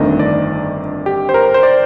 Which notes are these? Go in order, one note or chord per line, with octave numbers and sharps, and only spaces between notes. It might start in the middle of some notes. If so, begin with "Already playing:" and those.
Already playing: G1 F2 D#3 A3 D4 D#5
D5
G4
C5
A#4
C5
D5